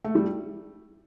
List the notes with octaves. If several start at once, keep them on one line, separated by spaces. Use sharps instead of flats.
A3
G3